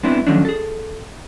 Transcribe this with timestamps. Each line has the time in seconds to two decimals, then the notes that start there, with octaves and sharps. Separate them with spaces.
0.03 G#3 B3 C4 D4 E4
0.27 D#3 F3 F#3 A3 C#4 D4
0.45 G#4 A4